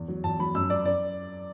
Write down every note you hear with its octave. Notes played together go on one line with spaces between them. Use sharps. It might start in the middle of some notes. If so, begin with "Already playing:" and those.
Already playing: E2
F#3
E2 A5
F#3 B5
F#2 E6
F#2 D5
D5